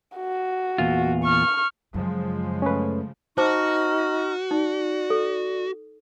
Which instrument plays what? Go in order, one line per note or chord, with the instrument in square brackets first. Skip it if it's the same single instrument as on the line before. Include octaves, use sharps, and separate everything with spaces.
[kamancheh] F#4
[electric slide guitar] E2 A#2 F4
[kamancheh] C#6 F6
[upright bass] F#2 [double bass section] C#3 F3 G#3
[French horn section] A3 [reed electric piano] C#4 B4
[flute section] D#4 C#6 F6 [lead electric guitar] F#4 [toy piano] C5 A5 D6
[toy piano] D#4 [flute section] D5
[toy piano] A4